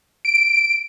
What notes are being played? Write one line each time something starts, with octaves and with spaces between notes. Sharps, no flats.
D7